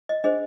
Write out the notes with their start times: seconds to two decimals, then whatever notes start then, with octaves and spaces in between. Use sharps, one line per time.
0.09 D#5
0.24 D4 G#4 C5 D#5